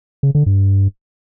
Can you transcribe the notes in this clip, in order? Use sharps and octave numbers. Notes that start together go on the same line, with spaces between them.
C#3
D3
G2